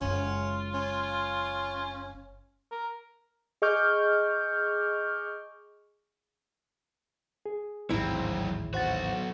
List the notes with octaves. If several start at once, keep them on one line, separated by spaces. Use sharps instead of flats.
F#1 G#3 C#4 F4
C#4
A#4
G#4 D#5 C#6 D6 F6 G6
G#4
A1 D#2 G#2 F#3 C4 E4
B1 F#4 C5 F#5 A6